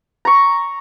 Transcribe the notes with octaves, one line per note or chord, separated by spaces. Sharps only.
A#5 C#6